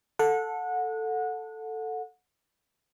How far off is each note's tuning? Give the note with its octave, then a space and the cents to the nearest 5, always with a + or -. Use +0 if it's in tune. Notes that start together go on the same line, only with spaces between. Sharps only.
A4 +5 F#5 -25